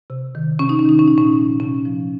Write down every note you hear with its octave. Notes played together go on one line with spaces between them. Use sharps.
C3
D#3
C3 C#4
D#4
C#4
D#3 D#4
C#4
A#2 D#4
C#4
F3
C3 C#4
F3